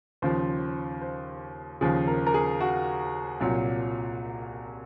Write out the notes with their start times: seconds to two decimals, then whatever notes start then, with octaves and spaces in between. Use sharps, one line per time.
0.22 D#2 C#3 F3 C5
1.01 C5
1.81 D#2 C#3 F3 G#4
2.08 A#4
2.27 A#4
2.34 G#4
2.61 F#4
3.40 C2 A#2 F#3